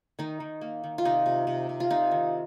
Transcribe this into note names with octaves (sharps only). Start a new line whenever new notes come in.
D#3 D#4
D#3
A#3
D#3
F4
C3 D#4
C3
C3
C3
F4
C3 D#4
D#3